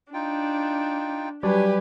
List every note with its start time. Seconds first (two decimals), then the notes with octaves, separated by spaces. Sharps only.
0.14 D4 D#4 F4 G5
1.43 F#3 G3 D4 G4 B4 C#5 D5 G#5